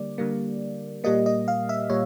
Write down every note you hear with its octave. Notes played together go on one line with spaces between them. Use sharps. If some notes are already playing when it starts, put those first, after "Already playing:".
Already playing: D3 G3 A#3 D5
D3 G3 A#3
A#2 G3 A#3 D#5
D#5
F5
E5
A#2 G3 C#5